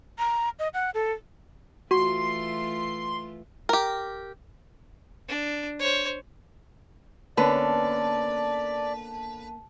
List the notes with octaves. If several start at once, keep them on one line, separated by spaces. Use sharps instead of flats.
A#5
D#5
F#5
A4
E3 A3 F4 F#4 C6
G4 A#4
D4
C5 C#5
D3 A#3 B3 C#4 B4 D5 A5